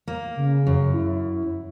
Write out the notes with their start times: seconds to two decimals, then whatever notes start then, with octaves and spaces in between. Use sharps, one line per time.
0.08 A#3
0.36 C#3
0.67 F#2
0.94 E4